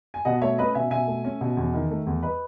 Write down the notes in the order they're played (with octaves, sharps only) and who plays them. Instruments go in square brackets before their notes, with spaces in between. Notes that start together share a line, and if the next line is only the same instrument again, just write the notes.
[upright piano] G#5
B2 D#5 F#5
A3 C#5 E5
C#4 B4 D#5
B2 E5 G#5
B2 E5 G#5
A3
C#4
B2
E2
D#3
A3
E2
B4 D#5